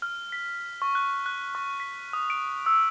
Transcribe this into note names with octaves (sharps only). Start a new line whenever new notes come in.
F6
B6
C#6
F#6
F#6
C#6
B6
D#6
D7
E6